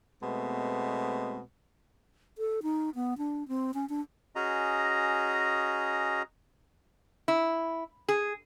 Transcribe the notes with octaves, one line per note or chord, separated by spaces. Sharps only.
B2 G#3 A3 B3 C4
A4
D#4
B3
D4
C4
C#4
D4
C#4 F#4 G#4 D#5 A#5
E4
G#4